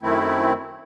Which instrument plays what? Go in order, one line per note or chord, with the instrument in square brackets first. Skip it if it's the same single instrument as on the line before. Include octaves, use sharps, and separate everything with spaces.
[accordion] F#2 D#3 A3 C4 E4